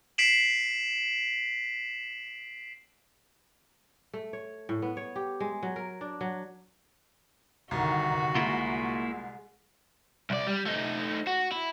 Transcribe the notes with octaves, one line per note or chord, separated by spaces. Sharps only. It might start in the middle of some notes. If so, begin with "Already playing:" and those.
B6 C7 D7 E7 F#7
A3
C#5
A2
B3
C#5
G4
G#3
F#3
A#4
D4
F#3
C2 D3 D#3 F#4
G#3 A#3 E4 F4
C2 D5
G3
A3 D#4
F#4
E4